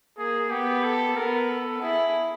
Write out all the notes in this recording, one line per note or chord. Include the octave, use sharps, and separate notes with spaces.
A#3 G#4
B3 G4
A4
B3 A#4
A4
E4 G#4